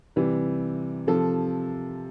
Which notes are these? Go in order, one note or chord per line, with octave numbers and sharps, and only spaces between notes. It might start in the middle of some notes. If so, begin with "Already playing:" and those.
C3 E3 G3
C3 F3 A4